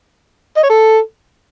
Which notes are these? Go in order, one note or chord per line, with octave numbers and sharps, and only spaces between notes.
D#5
C#5
A4